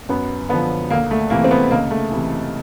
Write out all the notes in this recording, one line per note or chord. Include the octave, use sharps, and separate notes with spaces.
F#2 B3
D3 F3 B3
D2 A#3
A3
C3 E3 A#3
C4
B3
C#2 A#3
A3
C3 E3